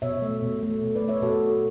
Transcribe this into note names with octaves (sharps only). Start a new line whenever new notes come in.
B2 C#5 E5
A3
B2
A3
B2
B4 D5
A3
C#5 E5
B2 F#4 A4
A3